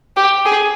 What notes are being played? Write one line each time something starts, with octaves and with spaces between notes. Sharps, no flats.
G4
G#4